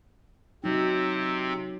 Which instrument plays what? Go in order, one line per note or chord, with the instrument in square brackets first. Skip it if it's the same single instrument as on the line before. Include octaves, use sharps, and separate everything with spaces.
[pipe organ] C3 C4 [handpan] F#3 D#4